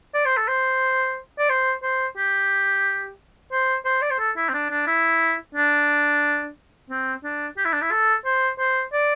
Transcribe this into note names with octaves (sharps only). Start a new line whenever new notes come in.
D5
C5
A4
C5
D5
C5
C5
G4
C5
C5
D5
C5
A4
E4
C4
D4
D4
E4
D4
C4
D4
G4
E4
D4
E4
A4
C5
C5
D5